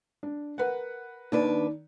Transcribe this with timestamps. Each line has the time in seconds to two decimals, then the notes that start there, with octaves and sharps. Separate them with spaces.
0.23 D4
0.58 A#4 B4 F#5
1.32 D#2 D#3 D4 B4